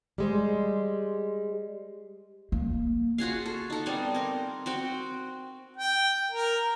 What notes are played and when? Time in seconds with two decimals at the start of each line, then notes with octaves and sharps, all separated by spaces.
0.18 G3 G#3 C5
2.52 A#3
3.18 F4 F#4 G#4 F5
3.46 A4
3.70 D#4 A4
3.86 G3 B3 C4
4.15 C4 A#4
4.66 C4 F#4 G5
5.77 G5
6.31 A#4